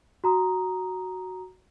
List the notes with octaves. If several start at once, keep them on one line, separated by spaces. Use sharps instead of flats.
F#4 A#5 D#6